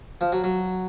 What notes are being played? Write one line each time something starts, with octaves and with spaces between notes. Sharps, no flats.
F3
F#3
F#3